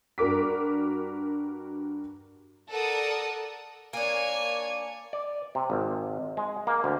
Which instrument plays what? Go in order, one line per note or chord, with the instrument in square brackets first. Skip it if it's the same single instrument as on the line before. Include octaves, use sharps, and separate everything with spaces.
[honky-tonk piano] G2 F#4 A#4 D6 B6
[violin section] A4 A#4 D5 F#5 D#6
[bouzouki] A#3 D4 [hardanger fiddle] C#5 G#5
[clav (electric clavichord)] D5
C3
G#1
G#3
A#3
D2